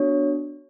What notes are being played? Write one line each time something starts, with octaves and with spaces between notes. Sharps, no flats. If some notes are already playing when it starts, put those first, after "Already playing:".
Already playing: B3 D4 F#4 C#5